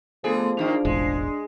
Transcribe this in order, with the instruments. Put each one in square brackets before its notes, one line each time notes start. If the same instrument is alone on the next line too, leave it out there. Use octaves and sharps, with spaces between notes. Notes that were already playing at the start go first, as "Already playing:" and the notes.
[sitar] D3 G#4 [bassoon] F3 [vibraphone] A3 B3 A4
[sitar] G#2 D#3 A#3 [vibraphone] D4 G#4 D5
[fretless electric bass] E1 A1 [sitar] G#3